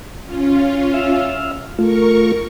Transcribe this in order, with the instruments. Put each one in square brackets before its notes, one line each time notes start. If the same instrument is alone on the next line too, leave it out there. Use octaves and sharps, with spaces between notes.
[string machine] C#4 F4
[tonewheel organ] E5 F5
[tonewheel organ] A3 F4 [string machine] A#4 C#6